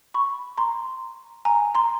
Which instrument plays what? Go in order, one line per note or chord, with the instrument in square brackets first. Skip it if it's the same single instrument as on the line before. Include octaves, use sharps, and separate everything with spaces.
[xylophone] B5 C#6
A#5 C6
G#5 A#5
A#5 C6